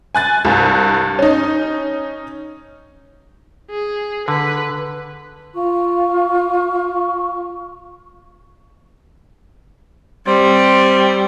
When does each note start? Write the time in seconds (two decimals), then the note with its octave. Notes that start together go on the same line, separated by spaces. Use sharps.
0.15 G#5 F#6 A6
0.45 C2 G2
1.19 C#4 D#4
3.70 G#4
4.28 D3 B4
5.53 F4 C#6
10.27 G3 C4